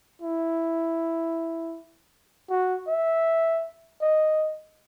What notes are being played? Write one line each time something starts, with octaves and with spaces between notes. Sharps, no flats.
E4
F#4
E5
D#5